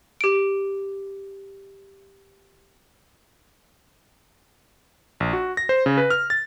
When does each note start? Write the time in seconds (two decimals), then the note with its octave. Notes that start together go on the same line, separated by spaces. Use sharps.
0.21 G4 D7
5.20 A#1
5.33 F#4
5.57 A#6
5.69 C5
5.86 C#3
5.98 B4
6.10 F6
6.30 A6